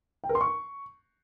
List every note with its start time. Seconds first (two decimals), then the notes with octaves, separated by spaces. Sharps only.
0.24 G5
0.29 A#4
0.35 C6
0.41 C#6